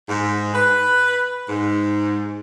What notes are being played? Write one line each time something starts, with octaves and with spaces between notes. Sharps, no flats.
G#2
B4
G#2